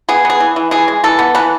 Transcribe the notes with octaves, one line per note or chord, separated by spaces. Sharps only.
B3 G#4
B3 G#4
E3
E3
E3 G#4
G#3
E3 A4
B3
E3 B4